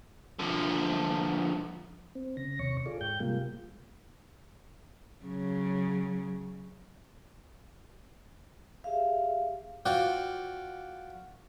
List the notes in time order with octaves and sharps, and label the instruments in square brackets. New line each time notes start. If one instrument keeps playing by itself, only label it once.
[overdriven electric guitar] D3 F3
[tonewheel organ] C4
C#3 A#6
D#2 C3 C#5 C#6
F4 G#4 A4 D5
G#2 G5 G6
C3 G3 G#3 A#3 F4
[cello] C#3 F#3
[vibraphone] G4 G#4 E5 F5
[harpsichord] F4 F#4 C5 D5 F5 G5